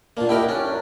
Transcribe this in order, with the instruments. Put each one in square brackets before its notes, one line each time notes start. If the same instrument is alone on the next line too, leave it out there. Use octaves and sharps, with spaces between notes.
[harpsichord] A#2 A#3 [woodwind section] D4
[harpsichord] E4 G4 A#4 [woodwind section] D#5 F#5 G5
[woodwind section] C#4 [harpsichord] D4
[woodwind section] F#2